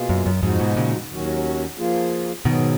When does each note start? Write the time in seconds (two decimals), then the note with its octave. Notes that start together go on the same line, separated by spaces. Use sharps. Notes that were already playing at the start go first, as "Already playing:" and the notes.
Already playing: B2 A#3 F4 G#4
0.09 F#2
0.26 F#2
0.43 F2 G#2 F3 G#3 D#4 F#4
0.60 G#2 B2
0.76 A#2 C#3
1.10 D#2 D#3 F#3 C#4 F#4
1.78 F3 A#3 F4 G#4
2.45 G#2 B2 D#3 F#3 B3